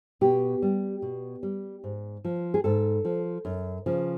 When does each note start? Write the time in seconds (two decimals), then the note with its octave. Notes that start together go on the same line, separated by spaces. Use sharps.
0.21 B2 G4
0.62 G3
1.02 B2
1.43 G3
1.84 G#2
2.25 F3
2.54 G#4
2.64 G#2 A4
3.05 F3
3.45 F#2
3.86 C#3 F3